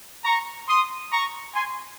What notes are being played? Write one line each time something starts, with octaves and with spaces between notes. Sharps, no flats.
A#5 C#6
C6 D#6
A#5 C#6
G#5 C6